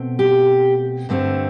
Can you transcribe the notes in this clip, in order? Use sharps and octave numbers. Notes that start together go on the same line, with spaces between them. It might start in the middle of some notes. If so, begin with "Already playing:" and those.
Already playing: B2 A3 C4
G4
G2 D3 A3 C4